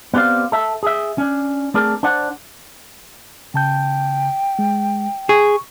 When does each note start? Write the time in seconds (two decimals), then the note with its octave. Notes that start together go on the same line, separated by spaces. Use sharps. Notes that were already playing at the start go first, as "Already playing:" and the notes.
0.14 B3 C4 G4 D5 F5
0.52 A4 E5
0.83 G#4 E5
1.18 C#4 D4
1.74 A3 C4 D4 G#4 A#4
2.03 D4 C5 D5 F#5
3.54 C#3 G5 A5 G6
4.59 G#3
5.29 G#4 C#6